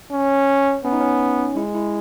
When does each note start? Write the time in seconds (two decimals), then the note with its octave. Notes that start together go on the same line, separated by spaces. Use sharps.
0.12 C#4
0.85 B3 C#4
0.93 D#4
1.00 C#4
1.56 G#3 E4
1.75 E4